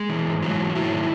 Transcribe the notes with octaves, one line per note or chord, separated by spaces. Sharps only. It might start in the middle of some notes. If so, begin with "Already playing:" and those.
Already playing: G#3
E3
G#2
E3 F#3
G#2
G#2 E4
D#3